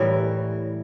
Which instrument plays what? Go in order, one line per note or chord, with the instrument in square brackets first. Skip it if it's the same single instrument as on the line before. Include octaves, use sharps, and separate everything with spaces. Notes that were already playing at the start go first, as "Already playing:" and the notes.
Already playing: [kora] A2 E3 G3 A#4